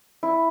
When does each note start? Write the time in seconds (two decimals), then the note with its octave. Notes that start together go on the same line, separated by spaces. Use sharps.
0.23 E4